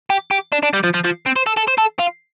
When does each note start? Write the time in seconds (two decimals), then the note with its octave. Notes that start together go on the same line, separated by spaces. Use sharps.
0.10 G4
0.31 G4
0.52 D4
0.63 D4
0.73 G3
0.84 F3
0.94 F3
1.05 F3
1.26 C4
1.36 C5
1.47 A4
1.57 A4
1.68 C5
1.78 A4
1.99 F4